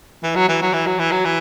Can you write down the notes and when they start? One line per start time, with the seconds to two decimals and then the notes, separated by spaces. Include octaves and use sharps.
0.23 E3
0.35 F#3
0.49 E3
0.61 F#3
0.73 E3
0.86 F#3
0.99 E3
1.11 F#3
1.25 E3